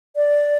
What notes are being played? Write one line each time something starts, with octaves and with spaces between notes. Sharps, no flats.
D5